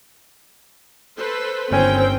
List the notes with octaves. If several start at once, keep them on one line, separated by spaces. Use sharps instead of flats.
A4 B4 C5
G1 D#3 C4 C#4 G5 G#5